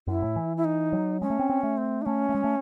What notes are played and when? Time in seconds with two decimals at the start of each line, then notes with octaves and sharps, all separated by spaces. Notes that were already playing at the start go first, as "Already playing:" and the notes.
0.07 F#2 E4
0.22 A2
0.36 E3
0.57 E4
0.65 D#4
0.93 F#3
1.21 G#3 C#4
1.30 A3
1.39 C4
1.50 C4
1.63 A3
1.77 C4
2.02 D#4
2.06 A3 C#4
2.29 A3
2.35 G#3
2.44 A3